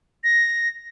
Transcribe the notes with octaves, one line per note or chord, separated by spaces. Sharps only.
A#6